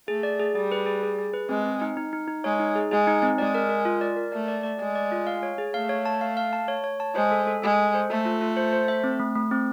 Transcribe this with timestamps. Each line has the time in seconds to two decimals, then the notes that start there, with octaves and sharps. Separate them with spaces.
0.08 A3 G#4
0.23 D5
0.40 G#4
0.55 G3 G#4
0.72 B4
0.86 G#4
1.03 G#4
1.19 G#4
1.33 B4
1.49 G#3 C4
1.65 C4
1.81 D#4
1.97 D#4
2.13 D#4
2.28 D#4
2.44 G#3 C#5
2.60 D#4
2.75 G#4
2.91 G#3 G#4
3.07 D#4
3.23 C4
3.38 G#3 D5
3.54 A#4
3.69 A#4
3.85 F4
4.01 D5
4.16 A#4
4.32 A3 D5
4.48 D5
4.63 D5
4.79 G#3 D5
4.95 D5
5.12 F4
5.27 F5
5.43 C#5
5.58 G#4
5.74 A3 F5
5.89 C#5
6.06 A5
6.21 F5
6.37 F5
6.53 A5
6.68 C#5
6.84 C#5
7.00 A5
7.15 G#3 C5
7.31 A4
7.47 A4
7.62 G#3 A4
7.78 A4
7.94 C5
8.10 A3 A4
8.25 F4
8.41 F4
8.57 C5
8.73 C5
8.88 E5
9.04 C4
9.20 A3
9.35 A3
9.51 C4